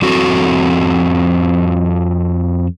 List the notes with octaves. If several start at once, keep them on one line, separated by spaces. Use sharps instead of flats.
F2 C4 F#4 A4